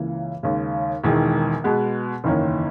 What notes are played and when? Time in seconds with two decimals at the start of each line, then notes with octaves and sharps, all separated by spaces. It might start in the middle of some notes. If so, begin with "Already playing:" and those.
Already playing: C#2 C#3 E3 A#3
0.43 D#2 C#3 G#3
1.04 E1 E2 D#3 G#3
1.64 B2 G#3 B3
2.24 F#1 E2 D#3 A#3 C#4